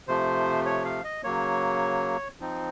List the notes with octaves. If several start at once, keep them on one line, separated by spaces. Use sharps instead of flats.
C3 F3 A3 C5
C#5
F5
D#5
C#3 F#3 A#3 C#5
F3 C4 D#4